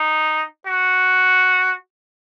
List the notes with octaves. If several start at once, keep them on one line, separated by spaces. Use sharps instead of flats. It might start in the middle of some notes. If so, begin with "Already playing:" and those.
Already playing: D#4
F#4